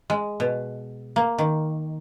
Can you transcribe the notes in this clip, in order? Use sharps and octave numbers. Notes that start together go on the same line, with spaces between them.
G#3
B2
A#3
D#3